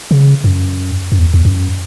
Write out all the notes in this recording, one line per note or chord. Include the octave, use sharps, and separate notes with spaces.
C#3
F#2
F#2
E2
E2
F#2